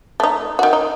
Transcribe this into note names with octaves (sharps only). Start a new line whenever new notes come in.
A3 D#4
D#3 F#4
D#4